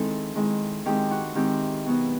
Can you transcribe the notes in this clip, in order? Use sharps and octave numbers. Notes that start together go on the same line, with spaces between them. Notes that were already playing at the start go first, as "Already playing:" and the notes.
Already playing: D#3 G#3 C4 E4 A4
D#3 G#3 C4 E4
D#3 G#3 C4 E4 G4
F#4
D#3 G#3 C4 E4 G4
B2 F#3 B3 D#4